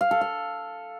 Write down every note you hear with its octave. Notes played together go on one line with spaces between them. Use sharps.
F5
A4
F5